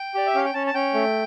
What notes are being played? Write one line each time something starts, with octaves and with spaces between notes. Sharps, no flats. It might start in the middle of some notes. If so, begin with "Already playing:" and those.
Already playing: G5
G4 D5
E5
C#4 F5
G5
C#4 A5
A5
C#4 G5
A3